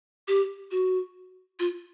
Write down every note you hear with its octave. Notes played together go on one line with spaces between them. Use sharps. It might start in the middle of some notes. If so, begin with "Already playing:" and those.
G4
F#4
F4